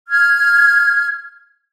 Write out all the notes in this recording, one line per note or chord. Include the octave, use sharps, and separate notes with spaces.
F6 G#6